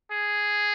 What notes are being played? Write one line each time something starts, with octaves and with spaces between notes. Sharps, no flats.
G#4